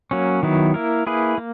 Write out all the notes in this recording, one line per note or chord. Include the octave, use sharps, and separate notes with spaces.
F#3 A#3 C#4
D#3 F#3 B3 E4
A#3 E4 A#4
A#3 E4 G#4 B4
A#3